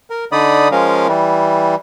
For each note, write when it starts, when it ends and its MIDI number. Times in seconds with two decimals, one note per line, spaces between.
0.10 0.25 70
0.32 0.68 50
0.32 0.68 63
0.32 0.68 74
0.32 0.68 83
0.32 0.68 87
0.72 1.07 53
0.72 1.07 56
0.72 1.07 61
0.72 1.07 70
0.72 1.07 77
1.07 1.75 52
1.07 1.75 55